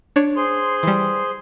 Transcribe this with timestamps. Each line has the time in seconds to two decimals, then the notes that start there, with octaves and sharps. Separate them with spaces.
0.16 D4 C#5
0.36 G#4 C5 C6
0.83 E3 G3